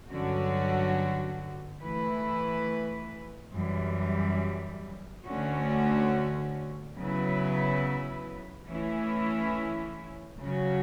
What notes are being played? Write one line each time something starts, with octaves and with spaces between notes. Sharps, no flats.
G2 D3 F#3 C#4 F#4
E3 A3 E4 B4
F#2 E3 G3
D2 D3 A3 C#4 F#4
C#3 F#3 B3 E4 B4
E3 A3 C#4 E4
C#3 F#3 C#4 F#4